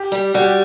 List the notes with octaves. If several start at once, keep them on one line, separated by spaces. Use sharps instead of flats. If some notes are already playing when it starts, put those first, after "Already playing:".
Already playing: G4
G3
G3 F#4
G4